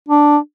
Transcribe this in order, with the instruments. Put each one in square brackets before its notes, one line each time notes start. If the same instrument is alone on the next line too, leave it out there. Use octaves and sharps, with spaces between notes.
[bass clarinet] D4